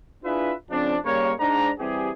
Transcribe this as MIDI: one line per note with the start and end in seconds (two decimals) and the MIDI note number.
0.24 0.52 62
0.24 0.52 64
0.24 0.52 65
0.24 0.52 68
0.24 0.52 71
0.24 0.52 76
0.71 0.96 49
0.71 0.96 53
0.71 0.96 60
0.71 0.96 62
1.05 1.33 49
1.05 1.33 55
1.05 1.33 58
1.05 1.33 70
1.05 1.33 73
1.39 1.70 44
1.39 1.70 62
1.39 1.70 82
1.79 2.10 52
1.79 2.10 55
1.79 2.10 60
1.79 2.10 67
1.79 2.10 68